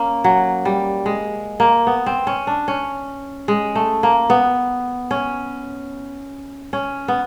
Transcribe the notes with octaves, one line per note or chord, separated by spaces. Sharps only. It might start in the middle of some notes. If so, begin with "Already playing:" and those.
Already playing: A#3 C#4
F#3
G3
G#3
A#3
B3
C4
C#4
D4
C#4
G#3
A3
A#3
B3
C#4
C#4
B3